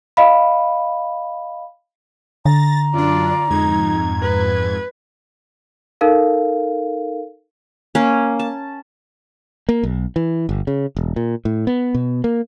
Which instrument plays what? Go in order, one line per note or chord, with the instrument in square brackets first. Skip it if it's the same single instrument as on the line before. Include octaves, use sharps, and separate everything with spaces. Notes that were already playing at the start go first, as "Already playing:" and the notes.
[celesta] D#5 F5 B5
[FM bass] D3 [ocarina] A#5 [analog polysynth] A6 A#6
[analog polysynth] F#2 D4 [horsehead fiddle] F4 D5
[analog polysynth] F2 G#2 G#6 [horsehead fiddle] D#4
[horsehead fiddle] B4
[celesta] D#4 A4 A#4 F5
[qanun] A#3 C#4
A5
[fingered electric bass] A#3
B1
E3
G1
C#3
E1
A#2
A2
B3
B2
A#3